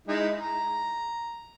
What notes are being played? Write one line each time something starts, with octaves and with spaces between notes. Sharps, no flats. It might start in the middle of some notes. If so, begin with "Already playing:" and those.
G#3 D#4 E4
A#5